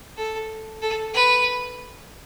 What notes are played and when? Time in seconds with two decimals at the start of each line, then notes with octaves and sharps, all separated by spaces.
0.17 A4
0.82 A4
1.14 B4